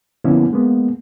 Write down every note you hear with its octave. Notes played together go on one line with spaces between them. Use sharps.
D3 F3 A#3 B3 C#4 E4
G#3 A#3 B3